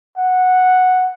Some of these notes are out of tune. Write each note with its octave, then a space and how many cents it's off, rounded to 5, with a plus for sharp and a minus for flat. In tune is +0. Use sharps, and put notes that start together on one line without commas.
F#5 -5